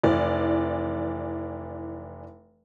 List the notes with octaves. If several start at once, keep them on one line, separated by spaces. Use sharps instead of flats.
F1 E3 D5